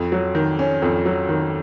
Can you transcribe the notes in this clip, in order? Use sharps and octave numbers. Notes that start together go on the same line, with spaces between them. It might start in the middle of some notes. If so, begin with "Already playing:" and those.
Already playing: F2
F#3
D#3
C#4
F2
F#3
D#3